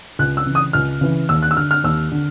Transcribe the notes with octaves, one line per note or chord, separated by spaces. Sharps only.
C#2 F#6
E6
C#3 E3
D#6
C#2 F6
C#3 E3
D#2 E6
F#6
E6
D3 F6
F6
D#2 E6
D3